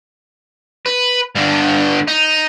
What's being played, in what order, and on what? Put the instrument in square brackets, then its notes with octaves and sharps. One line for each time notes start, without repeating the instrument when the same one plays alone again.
[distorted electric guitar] B4
G2 D3
D#4